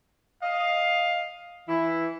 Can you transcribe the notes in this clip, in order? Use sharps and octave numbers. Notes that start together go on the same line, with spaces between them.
D#5 F5
E3 E4